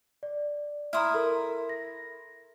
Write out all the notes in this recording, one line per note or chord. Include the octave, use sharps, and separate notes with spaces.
D5
E4 A#5 C6 D#6 F6
A4 A#4
A#6